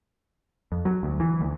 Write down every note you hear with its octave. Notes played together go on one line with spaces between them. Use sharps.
F2
F#3
D2
E3
D2